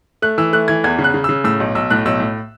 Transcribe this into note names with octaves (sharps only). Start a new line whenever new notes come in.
A3 F#6
E3 E6
A3 F#6
E3 G#6
E2 G#6
C#3
F#6
C#3
C#3 E6
A2 E6
B1
B1 E6
A2 F#6
B1 E6
A2